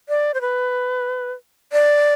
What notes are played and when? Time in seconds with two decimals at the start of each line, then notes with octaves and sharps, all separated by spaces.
0.09 D5
0.34 C5
0.41 B4
1.72 D5